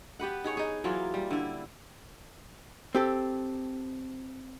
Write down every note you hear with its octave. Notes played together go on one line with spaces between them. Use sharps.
B3 G4 B4 F#5
D#4 G#4 C#5
D#4 G#4
E3 F#3 A#3 F4
G3
D3 E4
C4 G4 A4